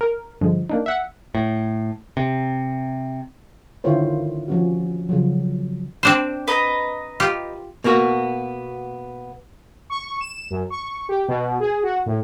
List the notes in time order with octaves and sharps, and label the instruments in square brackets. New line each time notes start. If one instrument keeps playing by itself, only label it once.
[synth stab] A#4
G2 D3 F3 G#3
A#3 D4 D#4
E5 F#5
[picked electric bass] A2
C3
[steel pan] D3 D#3 E4 F4 C5 C#5
F3 C#4 F#4
C#3 F3 F#3
[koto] C4 D4 C5
[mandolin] B4 D#5 A#5
[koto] F4 G4
[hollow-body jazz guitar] B2 A#3 B3 F#4
[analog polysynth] C#6
E7
F#2
C#6
G4
B2
G#4
F#4
A2